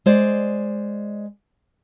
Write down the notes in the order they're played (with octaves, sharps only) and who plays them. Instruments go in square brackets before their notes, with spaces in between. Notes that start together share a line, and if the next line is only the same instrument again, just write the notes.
[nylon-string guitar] G#3 C5 D5